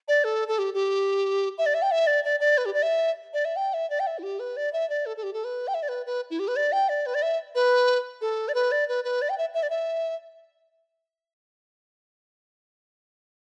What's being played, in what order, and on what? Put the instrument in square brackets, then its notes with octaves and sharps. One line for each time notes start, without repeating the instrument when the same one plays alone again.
[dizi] D5
A4
A4
G4
G4
E5
D5
E5
G5
E5
D5
D5
D5
B4
G4
D5
E5
D5
E5
G5
E5
D5
G5
E5
E4
G4
B4
D5
E5
D5
A4
A4
G4
A4
B4
G5
E5
D5
B4
B4
E4
G4
B4
D5
G5
D5
B4
D5
E5
B4
A4
D5
B4
D5
B4
B4
D5
G5
E5
E5
D5
E5